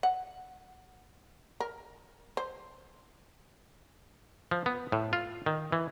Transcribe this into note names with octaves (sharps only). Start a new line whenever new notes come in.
F#5
A#4
C5
F3
B3
A2
F4
D#3
E3